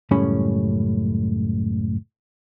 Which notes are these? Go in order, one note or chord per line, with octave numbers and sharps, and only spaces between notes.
C#2 F#2 A2 G3 C#4 B5